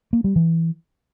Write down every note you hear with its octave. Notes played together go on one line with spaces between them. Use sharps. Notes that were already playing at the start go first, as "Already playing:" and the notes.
A#3
G3
E3